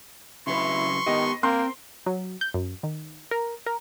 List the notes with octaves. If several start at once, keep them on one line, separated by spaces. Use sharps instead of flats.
C#3 F#3 E4 B4 C6 C#6
D#3 B3 G4 D#5
A#3 C4 A#4 G5 C6
F#3
G6
F#2
D#3
A#4
A#4